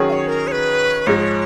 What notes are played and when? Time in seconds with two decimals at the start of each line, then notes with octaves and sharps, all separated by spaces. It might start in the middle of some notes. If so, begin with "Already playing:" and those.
Already playing: D#3 F#3 C#4 G#4
0.09 F5
0.13 C#5
0.28 A#4
0.47 C#5
0.52 B4
1.07 G#2 F3 G#3 C#5